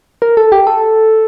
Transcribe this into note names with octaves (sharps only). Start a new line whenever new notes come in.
A#4
A4
G4
A4